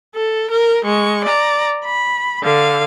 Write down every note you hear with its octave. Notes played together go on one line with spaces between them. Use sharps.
A4
A#4
G#3 C#6
D5 A#5
B5
D3 F5